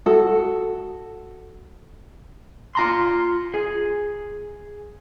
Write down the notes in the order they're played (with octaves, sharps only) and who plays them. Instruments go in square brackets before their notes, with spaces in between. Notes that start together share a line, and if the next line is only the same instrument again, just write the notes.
[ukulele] F#4 A4
[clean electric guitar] F4 A#5 C6
G#4